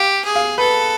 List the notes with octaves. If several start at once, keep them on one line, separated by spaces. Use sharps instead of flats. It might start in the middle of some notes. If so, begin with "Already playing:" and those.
Already playing: G4 F5
G#4
F5
A4 B4